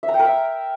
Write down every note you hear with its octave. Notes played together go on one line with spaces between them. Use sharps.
E5
A#5
G5
A#4
E5